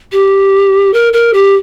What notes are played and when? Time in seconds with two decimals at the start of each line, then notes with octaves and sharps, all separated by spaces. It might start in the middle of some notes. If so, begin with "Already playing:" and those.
0.12 G4
0.94 A#4
1.13 A#4
1.34 G4